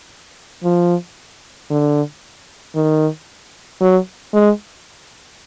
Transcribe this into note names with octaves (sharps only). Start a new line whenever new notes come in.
F3
D3
D#3
F#3
G#3